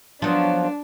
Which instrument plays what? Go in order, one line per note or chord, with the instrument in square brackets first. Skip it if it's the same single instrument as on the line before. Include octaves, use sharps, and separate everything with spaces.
[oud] F3 F#3 B3 [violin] D4